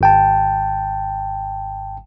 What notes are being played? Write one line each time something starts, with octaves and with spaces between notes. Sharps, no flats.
G#1 G5 A5